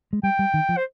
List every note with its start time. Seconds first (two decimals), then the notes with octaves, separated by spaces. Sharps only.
0.13 G#3
0.23 G3 G5
0.39 G3
0.54 D#3
0.69 F3
0.77 C5